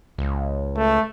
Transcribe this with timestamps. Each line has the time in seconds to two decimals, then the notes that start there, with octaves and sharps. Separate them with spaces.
0.18 C#2
0.77 A3